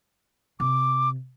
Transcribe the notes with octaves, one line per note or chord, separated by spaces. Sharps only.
C3 D6